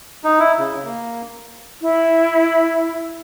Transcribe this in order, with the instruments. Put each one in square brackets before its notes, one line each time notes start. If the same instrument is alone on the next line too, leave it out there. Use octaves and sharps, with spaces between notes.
[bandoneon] D#4
E4
C#3
A#3
[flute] E4